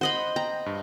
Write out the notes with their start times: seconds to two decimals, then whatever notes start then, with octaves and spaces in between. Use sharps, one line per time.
0.01 C5 D#5 F#5 B5
0.36 G5 A#5
0.66 G2